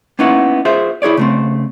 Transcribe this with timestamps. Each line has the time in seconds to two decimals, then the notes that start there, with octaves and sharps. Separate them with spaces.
0.19 A#3 B3 C#4 D#4 E4 F#5
0.65 F4 G#4 C5 E5
1.02 E4 G#4 C#5 D5
1.17 C#3 A3 C4